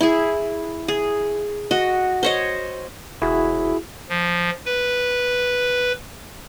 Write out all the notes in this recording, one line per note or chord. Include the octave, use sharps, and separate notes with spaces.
E4 G#4
G#4
F#4 D#5
C5 C#5 D#5
E1 E4 F#4 G#4
F3
B4